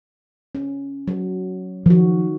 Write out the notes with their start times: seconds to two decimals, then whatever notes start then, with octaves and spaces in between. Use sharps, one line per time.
0.55 C#4
1.08 F#3
1.86 D#3 F3 F#4